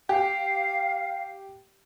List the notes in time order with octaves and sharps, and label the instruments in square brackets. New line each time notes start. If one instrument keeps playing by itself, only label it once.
[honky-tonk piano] G4 [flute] F5